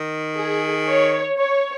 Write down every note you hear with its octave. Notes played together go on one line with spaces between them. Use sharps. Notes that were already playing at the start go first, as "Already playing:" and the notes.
Already playing: D#3
G#4
C#5
C#5